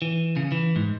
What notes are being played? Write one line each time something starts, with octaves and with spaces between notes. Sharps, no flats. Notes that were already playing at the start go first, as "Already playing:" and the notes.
E3
C#3
E3
G#2